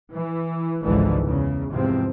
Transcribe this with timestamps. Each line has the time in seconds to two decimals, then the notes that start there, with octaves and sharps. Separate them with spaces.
0.14 E3
0.83 G#1 C#2 G#2 D3 E3 F3
1.25 E2 C#3
1.72 E2 G#2 C3 F3 C4